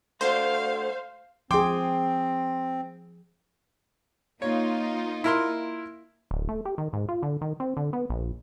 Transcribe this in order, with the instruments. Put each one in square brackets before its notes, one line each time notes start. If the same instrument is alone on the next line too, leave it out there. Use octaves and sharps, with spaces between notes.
[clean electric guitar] A3 D4 F#4 [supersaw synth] C5 [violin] F5
[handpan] F3 G#4 [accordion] C4 [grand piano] G5 C6 D6
[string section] A#3 D#4 F4 [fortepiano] C#5
[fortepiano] E4 A#4 C6
[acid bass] D1
A3
G4
D#3
G#2
F4
D3
D#3
C4
D3
B3
A#1